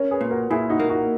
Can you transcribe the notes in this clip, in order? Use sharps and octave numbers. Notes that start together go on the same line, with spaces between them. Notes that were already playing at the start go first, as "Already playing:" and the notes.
Already playing: C#4 A#4 C#5
G#4 B4
A#2
F#4 A#4
A#2 E4 G#4
D#4 F#4
A#3
D#4 F#4